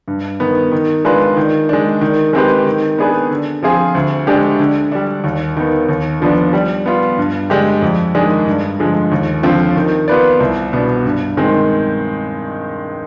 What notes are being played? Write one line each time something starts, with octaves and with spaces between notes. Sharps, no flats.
G2
D#3 B3
D#3
G#3 D4 F4 B4
D#3
G#3 D4
D#3
G#3 C4 G4 B4
D#3
B3 D4 G#4 B4
D3
F3 C4 F4 G#4
D2
D3 G#3 D4 G4
D3
G3 D4
D#2
D#3 B3
D#2
D3 F3 B3 D4
G3
B3 F4
G2
D3 G#3 D4 G4
F2
D#3 G#3 D4 G#4
G2
D3 F3 G#3
D#2
D3 F3 C4 F4
D#3
B3 F4 B4 D5
C2
B2 B3 D4
G2
D#3 G#3 C4